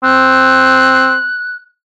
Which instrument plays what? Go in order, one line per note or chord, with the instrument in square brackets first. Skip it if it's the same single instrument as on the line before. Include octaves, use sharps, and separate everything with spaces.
[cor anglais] C4 [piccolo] F#6